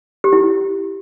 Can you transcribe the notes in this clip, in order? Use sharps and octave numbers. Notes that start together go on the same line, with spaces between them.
G4
E4